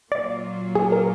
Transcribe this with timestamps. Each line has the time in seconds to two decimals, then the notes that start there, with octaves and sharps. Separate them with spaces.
0.12 A#2 F#3 A#3 F4 D5
0.75 G#4
0.92 A#4